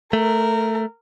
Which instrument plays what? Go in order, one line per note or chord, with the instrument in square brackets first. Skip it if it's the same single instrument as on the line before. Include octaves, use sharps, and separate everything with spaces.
[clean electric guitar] A3 [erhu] A#4